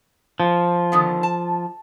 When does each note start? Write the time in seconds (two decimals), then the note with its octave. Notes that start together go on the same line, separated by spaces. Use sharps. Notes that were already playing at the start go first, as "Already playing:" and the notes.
0.40 F3
0.92 D3 D#3 B3
1.23 A5